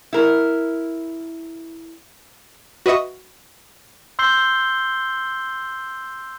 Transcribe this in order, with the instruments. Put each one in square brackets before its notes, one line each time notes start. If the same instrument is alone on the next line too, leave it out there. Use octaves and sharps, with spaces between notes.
[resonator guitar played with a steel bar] E4 A#4
[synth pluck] F#4 B4 D#5 E5 C#6 D#6
[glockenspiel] C6 E6 G6 C7 G7